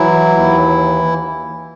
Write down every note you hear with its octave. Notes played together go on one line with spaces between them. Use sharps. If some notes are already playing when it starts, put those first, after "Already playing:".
Already playing: E3 F#3 E4
D#2